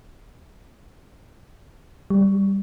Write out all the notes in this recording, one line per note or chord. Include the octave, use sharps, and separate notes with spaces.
G3